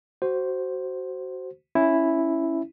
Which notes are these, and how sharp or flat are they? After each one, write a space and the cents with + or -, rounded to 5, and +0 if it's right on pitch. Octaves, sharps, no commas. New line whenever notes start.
F#4 +20 C5 +0
C#4 +0 E4 +0